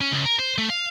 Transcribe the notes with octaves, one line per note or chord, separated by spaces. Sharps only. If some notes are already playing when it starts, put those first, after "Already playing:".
C#4
C#2
A#4
C5
A3
F5